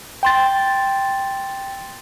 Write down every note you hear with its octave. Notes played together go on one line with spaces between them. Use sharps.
G5 C6 A6